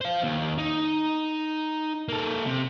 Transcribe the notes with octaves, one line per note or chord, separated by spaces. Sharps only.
C5 F5
D#2
D#4
A#3 A4
C3